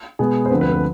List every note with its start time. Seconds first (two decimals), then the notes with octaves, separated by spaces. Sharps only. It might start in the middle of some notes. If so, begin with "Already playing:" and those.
0.19 B2 G#3 B3 G#4
0.46 C5
0.50 D2 D3 F3 C4 B4
0.61 B4
0.72 B4